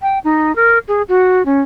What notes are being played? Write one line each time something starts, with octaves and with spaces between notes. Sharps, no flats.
G5
D#4
A#4
G#4
F#4
C#4